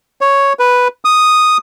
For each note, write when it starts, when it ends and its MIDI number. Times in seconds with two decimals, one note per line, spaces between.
0.21 0.53 73
0.59 0.88 71
1.05 1.57 87